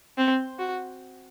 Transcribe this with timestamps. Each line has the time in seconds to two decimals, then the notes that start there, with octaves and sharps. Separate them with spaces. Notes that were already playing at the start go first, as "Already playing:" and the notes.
0.18 C4
0.59 F#4